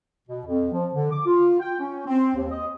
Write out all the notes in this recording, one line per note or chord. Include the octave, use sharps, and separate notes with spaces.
B2
F2
F3
D3
D6
F4
G5
C#4
C4
D#2
D#5